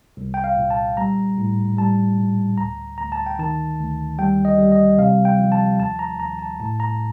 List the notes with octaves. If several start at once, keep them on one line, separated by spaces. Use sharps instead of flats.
C2
G5
F5
A#2
A5
G3 A#5
A2
G3 A5
A#2
D2 A#5
D2 A#5
A5
G5
D#3 A5
D2
G3 G5
D#5
G3
D#5
C3 F5
G5
F3
A5
D#2 A5
A#5
D#2 A#5
A5
A2 A5
A#5